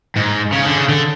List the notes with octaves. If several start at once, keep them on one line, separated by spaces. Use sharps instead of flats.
G#2
C#3
D3
C#3
D3